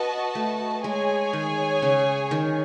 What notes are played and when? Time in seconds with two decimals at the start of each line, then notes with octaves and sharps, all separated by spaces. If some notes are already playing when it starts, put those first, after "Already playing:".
Already playing: F#4 B4 D#5 A5
0.35 A3
0.84 G#3 G#4 C#5 G#5
1.33 D#3
1.82 C#3
2.31 D#3